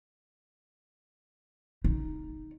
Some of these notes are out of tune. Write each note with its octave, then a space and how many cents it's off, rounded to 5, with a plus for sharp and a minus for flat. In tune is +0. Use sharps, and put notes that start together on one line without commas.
D#4 +0